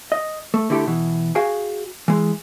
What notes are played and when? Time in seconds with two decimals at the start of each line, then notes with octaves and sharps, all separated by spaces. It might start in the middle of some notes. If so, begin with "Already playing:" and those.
0.12 D#5
0.54 A3
0.70 D3 A3 E4 G4 A4
0.87 B2 E3
1.35 F#4 G#4 F5 G5 G#5
2.08 E3 G#3